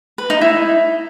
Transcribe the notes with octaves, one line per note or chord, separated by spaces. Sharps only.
B4
D#4
E4